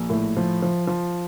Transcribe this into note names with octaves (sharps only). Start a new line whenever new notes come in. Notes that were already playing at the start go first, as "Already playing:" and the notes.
Already playing: A#1
A2
F3
F3
F3